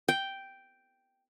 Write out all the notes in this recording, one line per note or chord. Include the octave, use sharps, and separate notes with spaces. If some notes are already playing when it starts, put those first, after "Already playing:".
G5